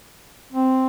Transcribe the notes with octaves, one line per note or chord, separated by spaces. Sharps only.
C4